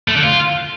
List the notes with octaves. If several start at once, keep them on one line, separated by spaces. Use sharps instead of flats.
A3
D3
F4